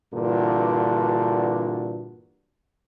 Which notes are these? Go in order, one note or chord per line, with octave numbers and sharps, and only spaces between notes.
G2 A#2 D3 E3 D4 F#4